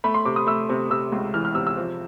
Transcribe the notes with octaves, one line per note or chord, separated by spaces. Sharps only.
A3 B5
C6
C3 D6
D#6
A3 E6
C3
C3 E6
C#2
E3 F6
F6
C3 E6
E6
F3